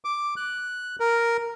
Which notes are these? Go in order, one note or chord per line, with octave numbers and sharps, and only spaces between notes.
D6
F#6
A#4